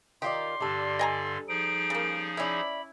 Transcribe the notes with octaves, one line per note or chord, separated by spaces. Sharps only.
D#3 F4 G4 D5 C6
G2 D3 G3 A4 D5
D#5 G#5 A#5
F3 D#4 G#4 D7
C#3 A#3
C#4 E4 D5 E5 B5